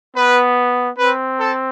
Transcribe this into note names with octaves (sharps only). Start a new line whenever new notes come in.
B3 B4
C4 B4
A4